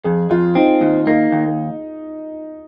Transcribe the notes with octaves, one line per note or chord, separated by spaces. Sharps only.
F2 G#4
F2 F4
C4 D#4
D#2 D#4
A#3 D#4
D#2